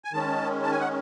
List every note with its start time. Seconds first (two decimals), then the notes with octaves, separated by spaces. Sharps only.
0.05 G#5
0.13 D#3 G#3 C#4 A5
0.63 A5
0.72 G#5
0.80 F#5